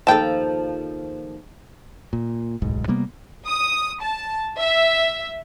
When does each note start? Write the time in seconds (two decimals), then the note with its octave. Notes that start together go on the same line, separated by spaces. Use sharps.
0.07 D#2 F3 A4 G5 A5
2.13 A#2
2.62 D1 B1 G#2
2.88 C3 G3 A#3 B3
3.46 D#6
4.01 A5
4.58 E5